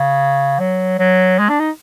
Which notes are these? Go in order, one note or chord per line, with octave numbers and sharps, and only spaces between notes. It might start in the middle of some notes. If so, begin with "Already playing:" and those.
Already playing: C#3
F#3
F#3
G#3
D4
D#4